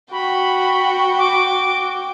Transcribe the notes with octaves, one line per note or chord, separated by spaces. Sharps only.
F#4 G5 B5 C#6
D6